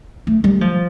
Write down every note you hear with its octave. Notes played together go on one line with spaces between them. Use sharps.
A3
G3
F3